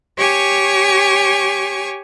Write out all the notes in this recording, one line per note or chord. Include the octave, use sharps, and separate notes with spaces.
G4 C#5 G#5 C#6